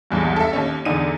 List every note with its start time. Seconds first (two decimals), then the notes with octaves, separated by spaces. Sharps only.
0.11 B1 E2 G2
0.36 A4 E5
0.53 D#2 C#4
0.85 E2 D3 D#4 D#7